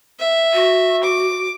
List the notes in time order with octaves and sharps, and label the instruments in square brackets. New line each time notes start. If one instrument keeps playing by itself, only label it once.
[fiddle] E5
[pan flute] F#4
[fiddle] D6